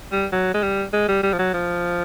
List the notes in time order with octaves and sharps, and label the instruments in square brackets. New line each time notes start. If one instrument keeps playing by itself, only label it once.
[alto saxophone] G3
F#3
G#3
G3
G#3
G3
G3
F3
F#3
F3